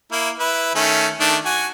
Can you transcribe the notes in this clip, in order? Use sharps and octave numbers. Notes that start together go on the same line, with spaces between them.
A#3 E4
E4 B4
D#3 A3 C#4
D#3 A3 D4
F#4 G#5